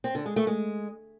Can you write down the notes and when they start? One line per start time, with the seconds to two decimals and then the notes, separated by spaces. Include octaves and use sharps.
0.04 C4
0.15 D3
0.26 G#3
0.36 A3
0.47 G#3